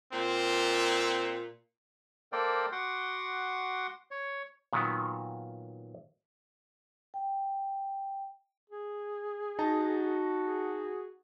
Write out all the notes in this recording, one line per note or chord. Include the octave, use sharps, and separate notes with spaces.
A#2 C4
A#3 A4 A#4 C5 D5 G5
F#4 F#5 C6 D6
C#5
A#2 D#3 F#3 B3
G5
G#4
D#4 F#4 A5 A#5
G#4